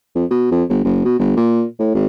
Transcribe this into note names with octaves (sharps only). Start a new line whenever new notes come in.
F2
B2
F2
G1
F#1
B2
G1
A#2
A2
G#1